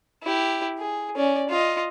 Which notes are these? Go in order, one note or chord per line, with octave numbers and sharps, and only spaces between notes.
E4 G4
G#4
C#4 D5
F4 D#5